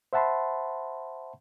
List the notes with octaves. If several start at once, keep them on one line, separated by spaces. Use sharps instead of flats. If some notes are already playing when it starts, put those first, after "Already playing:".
C5 E5 F#5 A5 B5 C6